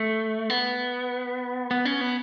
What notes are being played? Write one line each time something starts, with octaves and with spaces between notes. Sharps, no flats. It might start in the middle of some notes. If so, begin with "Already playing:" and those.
Already playing: A3
B3
B3
C#4
B3